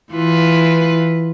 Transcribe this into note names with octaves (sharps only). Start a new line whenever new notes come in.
E3 F4 B4